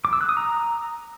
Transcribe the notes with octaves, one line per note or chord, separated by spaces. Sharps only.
D6
E6
F#6
D#6
A#5